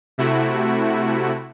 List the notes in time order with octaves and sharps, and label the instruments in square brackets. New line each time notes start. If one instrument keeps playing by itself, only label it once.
[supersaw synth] C3 A3 E4 F#4